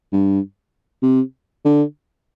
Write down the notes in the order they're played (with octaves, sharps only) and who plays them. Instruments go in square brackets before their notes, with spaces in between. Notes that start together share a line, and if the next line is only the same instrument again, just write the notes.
[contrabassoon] G2
C3
D3